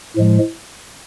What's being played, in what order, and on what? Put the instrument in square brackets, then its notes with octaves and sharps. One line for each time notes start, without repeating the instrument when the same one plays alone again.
[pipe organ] A2 F3 G#3